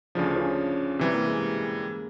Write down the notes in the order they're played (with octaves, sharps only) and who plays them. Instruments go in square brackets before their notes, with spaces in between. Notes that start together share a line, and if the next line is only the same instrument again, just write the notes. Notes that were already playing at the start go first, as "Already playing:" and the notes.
[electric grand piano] D2 C#3 F3 [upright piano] D4
[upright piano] C#4
[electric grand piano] C3 E3 G3 [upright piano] C4
[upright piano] A#3
G#3